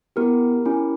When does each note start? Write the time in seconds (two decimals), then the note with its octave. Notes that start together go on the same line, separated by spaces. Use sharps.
0.16 B3 E4 G4 A#4
0.65 C#4 E4 G4